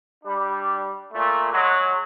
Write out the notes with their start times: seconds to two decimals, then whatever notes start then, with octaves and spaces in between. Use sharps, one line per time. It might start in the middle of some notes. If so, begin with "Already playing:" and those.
0.24 G3 D4
1.14 A#2 A3
1.52 F#3 G#3